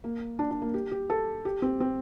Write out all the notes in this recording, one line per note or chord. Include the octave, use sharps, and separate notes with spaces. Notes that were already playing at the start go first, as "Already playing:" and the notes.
A#3
D4
D4
A#3
G4
G4
A4
G4
C4
C4